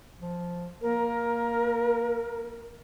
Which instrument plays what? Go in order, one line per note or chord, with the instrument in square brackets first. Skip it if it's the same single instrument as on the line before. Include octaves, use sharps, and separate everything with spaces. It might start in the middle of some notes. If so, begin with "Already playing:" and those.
[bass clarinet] F3
[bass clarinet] A#3 [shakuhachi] A#4